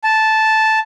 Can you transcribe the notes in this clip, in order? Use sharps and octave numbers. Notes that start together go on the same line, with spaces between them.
A5